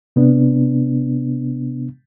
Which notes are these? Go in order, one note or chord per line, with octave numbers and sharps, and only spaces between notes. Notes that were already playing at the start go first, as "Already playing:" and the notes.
C3 B3 D4